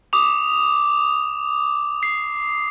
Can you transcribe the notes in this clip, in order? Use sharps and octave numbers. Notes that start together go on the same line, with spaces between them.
D6 D#6 F7
C7